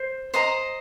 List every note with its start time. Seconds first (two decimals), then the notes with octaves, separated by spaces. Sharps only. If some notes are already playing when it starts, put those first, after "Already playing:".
Already playing: C5
0.34 C5 D#5 A#5